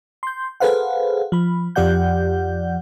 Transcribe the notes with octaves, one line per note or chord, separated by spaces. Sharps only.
C6 G6
G#4 A4 B4 C5 F5 F#5
F3 B5
F2 F3 G4 D5 F#5 G6